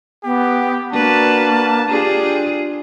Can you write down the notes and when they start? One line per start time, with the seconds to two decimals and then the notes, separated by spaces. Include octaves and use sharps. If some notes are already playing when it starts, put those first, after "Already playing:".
0.24 B3 G4
0.93 A#3 D4 F#4 B4 A5
1.89 D4 F4 G4 G#4